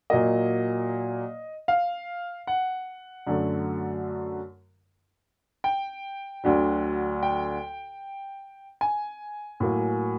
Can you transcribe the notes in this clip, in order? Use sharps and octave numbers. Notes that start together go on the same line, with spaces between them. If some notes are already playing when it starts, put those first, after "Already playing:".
A#2 F#3 A#3 D#5
F5
F#5
F#2 D3 F#3 A3
G5
D2 D3 F#3
G5
G#5
A2 F#3 A#3